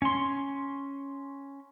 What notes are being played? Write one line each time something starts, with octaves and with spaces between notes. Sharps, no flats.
C#4 C6